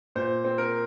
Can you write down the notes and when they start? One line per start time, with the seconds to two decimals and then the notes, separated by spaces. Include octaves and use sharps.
0.16 A#2 C5
0.45 C4
0.58 A#4